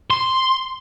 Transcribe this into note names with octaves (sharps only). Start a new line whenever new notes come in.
C6